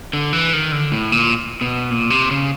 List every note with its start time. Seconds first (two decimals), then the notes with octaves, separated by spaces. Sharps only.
0.13 D3
0.33 E3
0.53 D#3
0.72 D3
0.92 A2
1.12 A#2
1.61 B2
1.91 A#2
2.10 C3
2.31 C#3